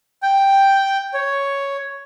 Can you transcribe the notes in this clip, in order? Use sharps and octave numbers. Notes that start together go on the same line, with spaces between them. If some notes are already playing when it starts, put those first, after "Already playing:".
G5
C#5